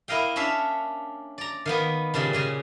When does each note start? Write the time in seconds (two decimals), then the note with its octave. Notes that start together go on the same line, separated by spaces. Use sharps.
0.08 A#3 E4 D#5 F5 G5
0.36 C#4 D4 C#5 E5 F5
1.38 D5 A#5
1.66 D#3 A#3 B3
2.14 A#2 C#3 G3 G#3
2.33 A#2 C#3 G#5